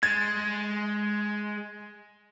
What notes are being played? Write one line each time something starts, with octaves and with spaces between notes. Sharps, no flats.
G#3 G#6 A6